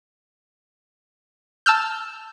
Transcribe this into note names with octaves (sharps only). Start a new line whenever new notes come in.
A5 E6 F6 G6